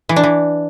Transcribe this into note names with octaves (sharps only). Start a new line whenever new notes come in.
E3
D4
E3